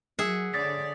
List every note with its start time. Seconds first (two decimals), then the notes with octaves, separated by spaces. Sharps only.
0.19 F#3 G#4 E5 F#5
0.54 D3 C#5 D5 D#6 A6 B6